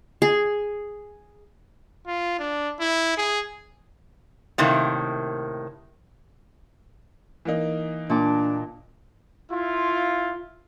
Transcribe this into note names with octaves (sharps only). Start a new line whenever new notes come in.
G#4
F4
D4
E4
G#4
A2 C3 D#3 A#3
E3 A#3 D#4
A#2 D4 A5 D6
E4 F4